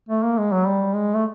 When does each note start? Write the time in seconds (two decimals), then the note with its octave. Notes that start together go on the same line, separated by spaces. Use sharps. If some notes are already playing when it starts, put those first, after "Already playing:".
0.09 A3
0.23 A#3
0.38 G#3
0.52 F#3
0.67 G3
0.95 G#3
1.15 A3